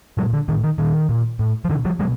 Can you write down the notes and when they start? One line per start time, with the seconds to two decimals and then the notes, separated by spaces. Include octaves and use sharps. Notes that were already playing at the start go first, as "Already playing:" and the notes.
0.17 A#2 F#3 G#3
0.33 D3
0.48 A2 D#3
0.64 D#3
0.78 A#2 D#3
1.09 A#2
1.39 A2
1.65 F3
1.69 B2 D3 E3
1.85 F3 G3
1.99 B2 F#3 G#3